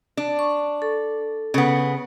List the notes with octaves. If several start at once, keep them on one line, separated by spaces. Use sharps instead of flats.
D4
C#6
A4
C#3 B3